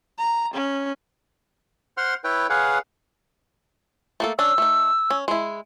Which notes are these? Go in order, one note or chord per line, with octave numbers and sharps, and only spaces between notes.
A#5
C#4
C5 F#5 C6 F6
E4 B4 C#5 G5
G#4 B4 C#5 F5 F#5
A3 A#3 A4
C#4 D4 E6
A3 D#4
C#4
G#3 E4